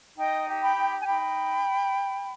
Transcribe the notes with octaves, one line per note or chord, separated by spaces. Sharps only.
D#4 D#5 G5
G4
G5 B5
D#4
G#5
D#4 G5 B5